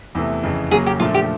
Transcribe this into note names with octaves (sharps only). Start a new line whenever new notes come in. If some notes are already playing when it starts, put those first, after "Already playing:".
E2 C3 E3 A3
F2 C#3 E3
C#3 F#3 A#3 C#4 G#4
G4
A#2 F3 A3 D4 F4
G4